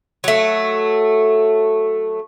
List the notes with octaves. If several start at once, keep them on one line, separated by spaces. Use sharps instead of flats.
F#3 A3